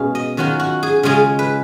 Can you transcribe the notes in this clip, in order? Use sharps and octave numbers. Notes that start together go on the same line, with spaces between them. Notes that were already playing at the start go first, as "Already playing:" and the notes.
Already playing: B2 G#3 C#4 F5
D#5
D#3 F#3 C#4 F4 F#4
F#4
G#4
C#3 G#3 C#4 F4 G#4
B4